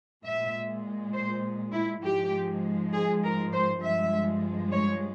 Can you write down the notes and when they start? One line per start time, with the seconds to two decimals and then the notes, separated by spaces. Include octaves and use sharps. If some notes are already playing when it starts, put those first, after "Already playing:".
0.23 A#2 G#3 E5
1.14 C5
1.73 E4
2.03 G#2 F3 G#3 G4
2.94 G#4
3.23 A#4
3.53 C5
3.82 G2 F3 G#3 E5
4.72 C#5